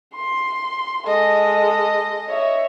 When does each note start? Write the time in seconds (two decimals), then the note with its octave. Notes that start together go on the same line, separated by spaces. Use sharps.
0.15 C6
1.07 G#3 A4 D#5
2.29 C#5 E5